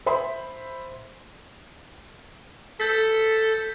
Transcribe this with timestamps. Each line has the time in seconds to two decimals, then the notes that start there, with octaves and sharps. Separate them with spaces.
0.06 C5 E5 B5 C6
2.80 A4 G6 A6 B6